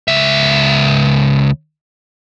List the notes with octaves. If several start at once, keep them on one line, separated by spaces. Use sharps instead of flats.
C#2 E5